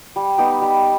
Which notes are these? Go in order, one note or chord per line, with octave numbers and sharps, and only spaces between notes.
G3
B3 D#4 G4
G3